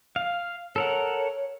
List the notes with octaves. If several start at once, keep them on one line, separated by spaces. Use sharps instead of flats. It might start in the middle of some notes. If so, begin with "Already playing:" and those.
F5
A4 A#4 C#5 F#5